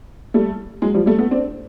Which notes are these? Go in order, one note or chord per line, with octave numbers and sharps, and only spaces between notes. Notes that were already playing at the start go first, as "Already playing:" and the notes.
G3 A3
F#3 G#3
F3 G3
G3 A3
A3 B3
C4 D4